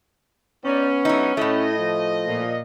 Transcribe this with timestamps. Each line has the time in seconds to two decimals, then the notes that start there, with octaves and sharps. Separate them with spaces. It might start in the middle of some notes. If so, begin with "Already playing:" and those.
0.64 B3 C#4 D#4 D5
1.05 F#3 D#4 E4 A4 E5
1.37 A2 A3 E4 D#5
1.79 F3
2.27 A#2